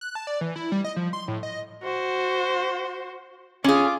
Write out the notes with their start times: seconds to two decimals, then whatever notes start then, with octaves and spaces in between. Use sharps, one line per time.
0.01 F#6
0.15 A5
0.27 D5
0.41 E3
0.56 E4
0.72 G3
0.84 D#5
0.96 F3
1.13 C6
1.28 A2
1.43 D#5
1.83 F#4 C5
3.64 C#4 F4 G#4 D6